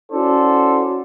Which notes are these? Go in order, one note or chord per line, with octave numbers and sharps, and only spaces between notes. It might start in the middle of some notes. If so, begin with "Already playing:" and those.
C#4 E4 F#4 A4 C5 D5